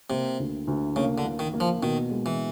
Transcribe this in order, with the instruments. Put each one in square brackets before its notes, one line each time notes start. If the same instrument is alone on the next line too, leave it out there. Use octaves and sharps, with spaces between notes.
[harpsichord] C3 [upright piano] A#3
[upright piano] D2
D2
[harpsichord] C#3 [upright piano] A#3
[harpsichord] D3
[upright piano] A#3
[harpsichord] D#3
[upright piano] A#3
[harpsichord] F3
[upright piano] B2 [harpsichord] D#3
[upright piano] G#3
[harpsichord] E3